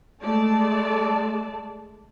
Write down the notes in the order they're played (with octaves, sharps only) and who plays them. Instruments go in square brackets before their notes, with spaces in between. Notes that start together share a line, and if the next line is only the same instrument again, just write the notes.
[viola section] G#3 A3 D5 A5